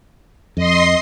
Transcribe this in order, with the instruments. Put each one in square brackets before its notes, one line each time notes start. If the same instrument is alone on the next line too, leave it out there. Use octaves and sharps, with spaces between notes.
[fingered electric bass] F2 [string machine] D#5 C6 C7